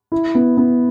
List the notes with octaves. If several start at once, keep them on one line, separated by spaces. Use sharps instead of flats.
E4
B3
B3